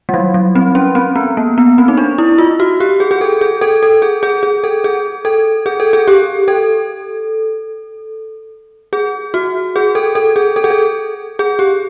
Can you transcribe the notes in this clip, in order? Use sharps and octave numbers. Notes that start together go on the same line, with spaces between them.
G3
F#3
F#3
C4
C#4
C4
B3
A#3
B3
C4
D#4
D4
E4
F4
F#4
G4
G#4
G#4
A4
G#4
A4
A4
G#4
G#4
G#4
A4
G#4
A4
G#4
A4
G#4
G4
A4
G#4
F#4
G#4
A4
A4
G#4
A4
G#4
A4
G#4
G4